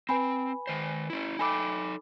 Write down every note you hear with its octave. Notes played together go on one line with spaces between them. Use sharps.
C4 B4 G#5 B5
D#3 C5
C#4 E4
D#4 A4 G5 G#5 B5 D6